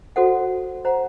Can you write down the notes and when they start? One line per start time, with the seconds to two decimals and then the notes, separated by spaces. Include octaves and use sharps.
0.16 F#4 A4 C5 F#5
0.85 C5 F#5 A#5